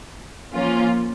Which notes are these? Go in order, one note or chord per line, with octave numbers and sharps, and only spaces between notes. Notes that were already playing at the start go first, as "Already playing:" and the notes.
F3 A#3 C#4 F4